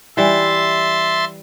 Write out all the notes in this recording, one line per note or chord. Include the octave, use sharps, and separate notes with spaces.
E3 G3 E5 C6 A6